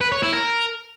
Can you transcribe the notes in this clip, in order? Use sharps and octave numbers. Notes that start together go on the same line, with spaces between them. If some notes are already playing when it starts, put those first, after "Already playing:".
B4
C#5
E4
A#4